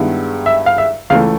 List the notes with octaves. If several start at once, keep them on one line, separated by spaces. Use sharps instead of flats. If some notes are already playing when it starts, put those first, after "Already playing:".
Already playing: G2 D#3 G#3 B3 E4
E5
F5
E5
C#2 C#3 E3 A3 F5